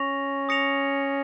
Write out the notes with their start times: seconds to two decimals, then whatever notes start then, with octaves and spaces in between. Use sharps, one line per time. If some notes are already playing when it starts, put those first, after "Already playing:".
Already playing: C#4 C#6 A#6 F7
0.49 D#6 A#6 C#7 F7